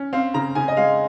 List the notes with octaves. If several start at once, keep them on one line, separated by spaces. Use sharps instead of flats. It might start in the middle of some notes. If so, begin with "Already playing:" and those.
Already playing: C#4
C4 F5
C#3 A#5
C#3 G#5
D#5
G#3 F5